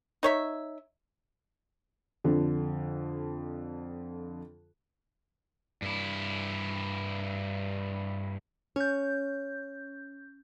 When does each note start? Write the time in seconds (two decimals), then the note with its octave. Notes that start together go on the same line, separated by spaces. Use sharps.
0.23 D#4 C#5 E5
2.24 F2 D3
5.82 G2 E4
8.76 C#4 C#5 G6